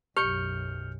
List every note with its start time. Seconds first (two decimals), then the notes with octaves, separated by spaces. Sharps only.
0.17 B1 F#2 G4 F6 G6 C#7